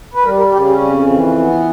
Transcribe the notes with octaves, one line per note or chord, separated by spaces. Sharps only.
B4
G3 A#4
A#4
C#3 G4
C#4
F2
E3
B3